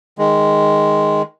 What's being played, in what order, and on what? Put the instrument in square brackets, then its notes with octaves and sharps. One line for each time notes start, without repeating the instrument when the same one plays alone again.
[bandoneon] D#3 G#3